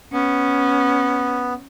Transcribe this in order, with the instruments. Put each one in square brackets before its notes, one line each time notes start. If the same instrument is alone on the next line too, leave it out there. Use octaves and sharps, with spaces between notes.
[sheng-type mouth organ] B3 [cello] C#4